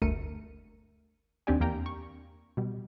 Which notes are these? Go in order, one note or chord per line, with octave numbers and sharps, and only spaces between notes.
G1 D2 A3 A#4 C#7 D#7
D#2 C4 D4 G4 D5 G#5
E2 A#3 G5 A#5
C#6
B2 G3